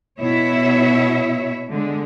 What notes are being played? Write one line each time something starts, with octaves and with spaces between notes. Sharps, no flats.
B2 E4 C#5 E5
D3 G#3